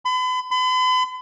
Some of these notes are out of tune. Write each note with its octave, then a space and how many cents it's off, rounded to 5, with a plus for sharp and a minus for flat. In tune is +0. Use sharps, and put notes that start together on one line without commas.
B5 +40
B5 +45